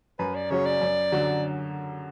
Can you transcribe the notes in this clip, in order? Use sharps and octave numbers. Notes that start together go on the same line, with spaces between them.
F#2 B4
D5
C#3 F#3 C#4 C#5
D5
F#2
D3 F#3